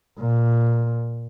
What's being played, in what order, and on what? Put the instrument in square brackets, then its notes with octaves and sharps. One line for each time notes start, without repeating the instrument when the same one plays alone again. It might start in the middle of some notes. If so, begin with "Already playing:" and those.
[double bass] A#2